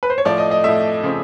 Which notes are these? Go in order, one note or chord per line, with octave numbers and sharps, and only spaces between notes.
B4
C5
C#5
A2 F3 A3 D5
D#5
D#5
A2 F3 A3 E5
C#3 F3 A3 C4